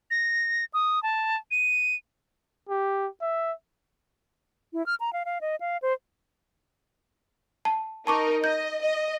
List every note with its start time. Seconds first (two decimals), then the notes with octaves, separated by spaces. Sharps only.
0.11 A#6
0.74 D#6
1.03 A5
1.51 D#7
2.69 G4
3.22 E5
4.73 E4
4.86 F6
5.00 A#5
5.13 F5
5.25 F5
5.41 D#5
5.60 F5
5.82 C5
7.65 A5
8.07 D#4 A#4 A5 C#6 D6
8.44 D#5 G6
8.82 D#5